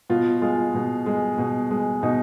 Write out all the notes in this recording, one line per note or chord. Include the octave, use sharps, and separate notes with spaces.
B2 F4
G#3 F4
B2
G#3
B2
G#3
B2 D#4